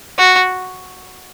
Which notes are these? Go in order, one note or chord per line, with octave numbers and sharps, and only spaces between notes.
F#4